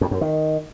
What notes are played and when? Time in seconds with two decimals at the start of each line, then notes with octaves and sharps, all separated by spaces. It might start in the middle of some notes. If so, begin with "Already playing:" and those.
0.01 F2
0.11 F#2
0.21 D#3